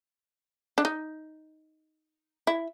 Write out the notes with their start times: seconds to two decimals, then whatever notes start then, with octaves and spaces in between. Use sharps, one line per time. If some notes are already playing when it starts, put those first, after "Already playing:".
0.78 D4
0.85 D#4
2.47 E4